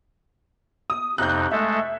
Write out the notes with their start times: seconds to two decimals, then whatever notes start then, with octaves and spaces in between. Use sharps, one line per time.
0.90 D#6
1.18 F2 C3 D#4 F#6 G6
1.52 G#3 A3 A4 E5